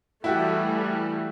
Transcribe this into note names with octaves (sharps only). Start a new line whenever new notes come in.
E3 G3 A3 E4 F#4 G4